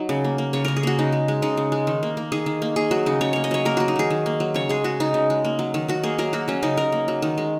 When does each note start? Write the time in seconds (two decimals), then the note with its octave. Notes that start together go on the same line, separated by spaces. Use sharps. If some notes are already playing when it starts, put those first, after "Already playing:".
Already playing: F#3 D#4
0.09 C#3
0.24 A#3
0.38 A#3
0.53 C#3 C#5
0.65 C#3 A#4
0.76 G#4
0.83 A#3 F#4
0.99 C#3 D#4
1.12 G#3
1.28 G#3
1.42 C#3 D#4
1.57 C#3
1.72 G#3
1.87 D#3
2.03 A#3
2.17 A#3
2.32 D#3 G#4
2.46 D#3
2.62 A#3
2.76 A#3 G#4
2.91 F#3 F#4
3.06 C#3 D#4
3.21 C#3 C#5
3.33 A#3 C#5
3.44 D#5
3.51 F#3 C#5
3.65 A#3 A#4
3.77 F#3 F#4
3.88 D#4
3.96 D#3 G#4
4.10 D#3
4.26 A#3
4.40 F#3
4.54 C#3 C#5
4.69 G#3 G#4
4.84 G#3 F#4
5.00 C#3 D#4
5.14 C#3
5.30 G#3
5.45 A#3
5.59 F#3
5.74 D#3
5.88 D#3 F#4
6.03 A#3 G#4
6.18 F#3 A#4
6.33 A#3 F#4
6.48 F#3 C#4
6.63 C#3 D#4
6.77 C#3 A#4
6.92 A#3
7.08 F#3
7.22 D#3
7.38 G#3